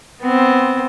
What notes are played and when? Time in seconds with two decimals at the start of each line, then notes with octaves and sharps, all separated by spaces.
0.22 B3 C4